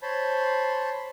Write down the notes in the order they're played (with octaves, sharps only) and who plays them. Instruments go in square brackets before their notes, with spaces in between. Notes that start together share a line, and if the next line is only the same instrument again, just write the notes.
[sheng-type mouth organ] C5 C#5 A5 B5 C6